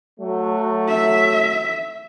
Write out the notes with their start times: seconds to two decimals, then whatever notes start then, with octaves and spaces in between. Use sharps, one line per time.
0.19 F#3 A3
0.88 E5